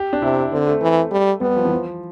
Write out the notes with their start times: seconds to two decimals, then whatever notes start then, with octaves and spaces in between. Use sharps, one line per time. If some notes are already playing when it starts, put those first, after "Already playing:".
Already playing: G4
0.13 D4
0.22 C3 E4
0.52 D3 C4
0.67 A3
0.81 E3
1.11 G3
1.41 G3 B3
1.57 F3
1.65 E3
1.72 F3